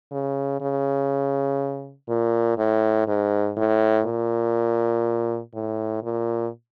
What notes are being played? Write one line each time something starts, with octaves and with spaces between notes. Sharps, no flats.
C#3
C#3
A#2
A2
G#2
A2
A#2
A2
A#2